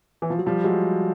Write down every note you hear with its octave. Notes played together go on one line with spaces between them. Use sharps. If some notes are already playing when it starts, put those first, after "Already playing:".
E3
F3
F#3
F3 G3
F#3 G#3